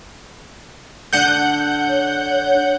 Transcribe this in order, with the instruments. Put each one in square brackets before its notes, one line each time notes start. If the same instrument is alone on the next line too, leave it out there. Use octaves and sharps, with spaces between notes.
[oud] D3 D4 [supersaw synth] F#5 G6
[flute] C#5